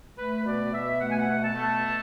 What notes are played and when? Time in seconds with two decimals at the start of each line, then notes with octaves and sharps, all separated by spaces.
0.18 A3 B4
0.46 B2 D5
0.73 B2 E5
1.00 A3 F#5
1.10 G#5
1.18 F#5
1.28 B2
1.42 A5
1.55 A3